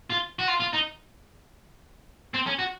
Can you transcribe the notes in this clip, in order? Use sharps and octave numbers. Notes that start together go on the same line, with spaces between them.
F4
F#4
F4
F4
D#4
C4
C#4
F#4